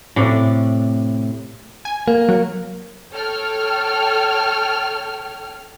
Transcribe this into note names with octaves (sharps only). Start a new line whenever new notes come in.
A2 C3 D5
G#5
A#3
F#3
A4 C#5 G5 F6